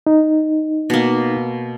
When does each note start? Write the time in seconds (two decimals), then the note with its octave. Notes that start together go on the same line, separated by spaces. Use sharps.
0.07 D#4
0.90 B2 A#3